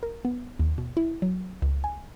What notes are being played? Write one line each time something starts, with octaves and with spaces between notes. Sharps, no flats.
A#4
B3
D#2
B2
E4
F#3
C#2
G#5